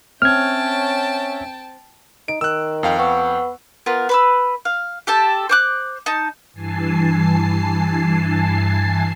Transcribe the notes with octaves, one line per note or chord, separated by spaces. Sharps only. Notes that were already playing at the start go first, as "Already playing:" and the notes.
C4 C#4 C#5 E5 G5 A5 F6 G#6
D#4 D7
D#3 E6 F#6
F2 F5 G5
B3 F#5 C#6 E6
B3 F4 A#4
B4 B5 E6
F5
G4 A4 A5
C5 D6 F#6
D#4 A5
G2 E3 G#5 A5 C7